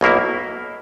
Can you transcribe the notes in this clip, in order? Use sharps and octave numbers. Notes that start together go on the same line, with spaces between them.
B1 B2 A#3 E4